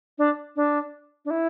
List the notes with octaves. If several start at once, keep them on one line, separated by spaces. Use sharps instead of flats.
D4
D4
D4
E4